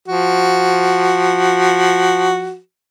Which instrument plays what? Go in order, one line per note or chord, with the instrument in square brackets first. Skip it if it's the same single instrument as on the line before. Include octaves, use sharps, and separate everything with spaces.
[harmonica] F3 F#4